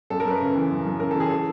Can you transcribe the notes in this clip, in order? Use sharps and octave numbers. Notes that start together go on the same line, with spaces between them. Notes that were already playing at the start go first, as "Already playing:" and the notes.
F#2 A4
A#4
F#2
B4
C#3
E3
F#2
F#2
C#3 A#4
E3 A4
G#4
A4